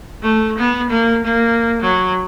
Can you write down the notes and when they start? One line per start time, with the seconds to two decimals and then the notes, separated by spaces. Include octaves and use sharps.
0.22 A3
0.58 B3
0.90 A#3
1.24 A#3
1.82 F#3